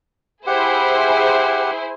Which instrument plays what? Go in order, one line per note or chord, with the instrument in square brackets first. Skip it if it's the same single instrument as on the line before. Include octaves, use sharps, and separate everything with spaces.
[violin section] E4 G#4 C5 [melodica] G4 F#5